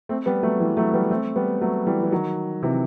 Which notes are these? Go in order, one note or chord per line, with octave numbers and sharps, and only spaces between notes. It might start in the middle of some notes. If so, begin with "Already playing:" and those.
A3 C4
G3 B3
F#3 A3
E3 G3
F#3 A3
G3 B3
A3 C4
G3 B3
F#3 A3
E3 G3
E3
D#3 F#3
C3 E3